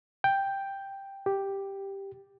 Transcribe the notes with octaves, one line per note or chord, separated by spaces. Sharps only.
G5
G4